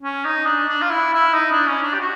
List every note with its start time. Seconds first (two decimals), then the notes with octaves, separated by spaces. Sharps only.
0.02 C#4
0.25 D#4
0.46 D4
0.68 D4
0.82 F4
0.90 E4
1.12 E4
1.34 D#4
1.51 D4
1.66 C#4
1.83 D4
1.93 G4
1.99 F#4